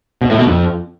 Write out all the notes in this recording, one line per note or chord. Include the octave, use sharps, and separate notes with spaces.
B2
A2
B2
F2